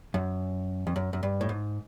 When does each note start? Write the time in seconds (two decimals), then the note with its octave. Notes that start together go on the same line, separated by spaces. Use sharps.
0.14 F#2
0.87 F2
0.96 F#2
1.13 F#2
1.23 G2
1.41 A2
1.49 G#2